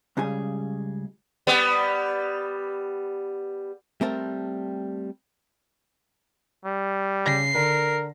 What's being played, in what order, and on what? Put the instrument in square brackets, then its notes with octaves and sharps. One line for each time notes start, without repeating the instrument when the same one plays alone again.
[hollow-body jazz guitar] C#2 C#3 G3 G#4 G#5
[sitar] G3 B3
[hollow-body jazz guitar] G3 A3 C4 A#4 A5
[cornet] G3
[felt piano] C#3 A#6 [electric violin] C7
[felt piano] D3 [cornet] A#4